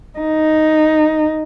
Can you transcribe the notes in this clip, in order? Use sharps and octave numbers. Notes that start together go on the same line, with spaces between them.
D#4